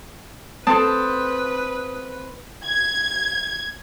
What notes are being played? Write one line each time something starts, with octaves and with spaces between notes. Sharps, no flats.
C4 A4 B4 A5 D#6
G#6